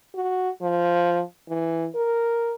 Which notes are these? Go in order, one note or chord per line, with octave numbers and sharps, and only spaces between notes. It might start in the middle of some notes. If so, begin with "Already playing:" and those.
F#4
F3
E3
A#4